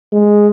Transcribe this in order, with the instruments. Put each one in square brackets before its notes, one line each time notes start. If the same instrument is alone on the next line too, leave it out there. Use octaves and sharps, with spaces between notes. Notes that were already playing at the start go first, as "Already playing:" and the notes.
[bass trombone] G#3